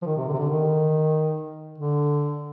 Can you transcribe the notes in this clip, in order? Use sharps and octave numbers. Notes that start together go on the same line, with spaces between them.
F3
D#3
C3
D3
C3
D3
D#3
D3